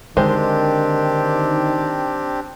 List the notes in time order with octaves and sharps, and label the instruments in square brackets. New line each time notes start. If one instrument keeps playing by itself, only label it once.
[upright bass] D3 [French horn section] D#3 [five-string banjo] G#3 C5 [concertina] C4 D4 G4